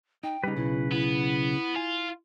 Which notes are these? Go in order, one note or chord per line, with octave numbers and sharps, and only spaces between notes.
D#4 G5
C#3 G3 D#4 B4
B1 E4
B3 E4
F4 G#5